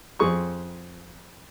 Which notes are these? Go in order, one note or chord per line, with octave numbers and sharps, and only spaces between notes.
F2 C4 G#4 C#6 D#6